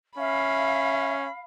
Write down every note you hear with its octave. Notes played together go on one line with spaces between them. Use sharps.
C#4 E5 F5 B5